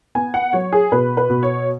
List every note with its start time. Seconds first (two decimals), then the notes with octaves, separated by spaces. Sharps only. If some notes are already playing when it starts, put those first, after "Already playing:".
0.15 B3 G#5
0.34 F#5
0.53 F#3 C#5
0.73 G#4
0.92 B2 B4
1.17 B4
1.30 B2
1.43 C#5